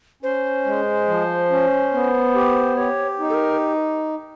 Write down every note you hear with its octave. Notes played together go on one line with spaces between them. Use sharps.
C#4 C5
G#3
F3
C#4
B3
G4
G4 C#5
D#4
A4
A#4